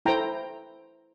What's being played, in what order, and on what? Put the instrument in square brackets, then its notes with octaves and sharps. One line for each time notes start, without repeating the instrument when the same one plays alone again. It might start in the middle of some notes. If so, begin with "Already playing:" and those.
[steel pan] E4 A4 C5 G5 A#5